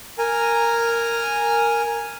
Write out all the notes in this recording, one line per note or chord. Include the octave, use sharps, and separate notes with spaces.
A#4 G#5 A#5